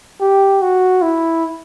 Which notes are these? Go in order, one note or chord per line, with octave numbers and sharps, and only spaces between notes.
G4
F#4
E4